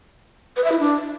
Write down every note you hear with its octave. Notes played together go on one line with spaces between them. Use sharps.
B4
E5
E4
D4